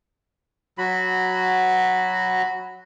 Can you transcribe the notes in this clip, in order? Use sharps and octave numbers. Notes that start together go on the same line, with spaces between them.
F#3 F#4 B5